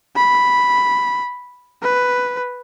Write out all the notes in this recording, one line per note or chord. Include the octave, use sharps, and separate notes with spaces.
B5
B4